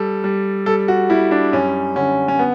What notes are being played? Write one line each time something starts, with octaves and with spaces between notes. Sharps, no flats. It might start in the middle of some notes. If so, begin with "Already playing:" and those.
Already playing: G3 A4
G3
G3 A4
F#4
G3 E4
D4
F#2 C#4
D3 C#4
C#4
B3